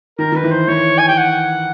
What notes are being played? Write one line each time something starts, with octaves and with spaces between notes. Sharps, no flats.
D#3 A#4
D#3 B4
E3
C5
E3 C#5
G#5
G5
F#5